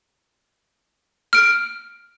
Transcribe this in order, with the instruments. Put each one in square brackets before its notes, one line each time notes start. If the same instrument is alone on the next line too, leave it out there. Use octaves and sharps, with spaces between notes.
[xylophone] F6 D7